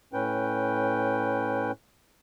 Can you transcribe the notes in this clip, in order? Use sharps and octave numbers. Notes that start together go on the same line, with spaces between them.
A2 C#4 B4 G5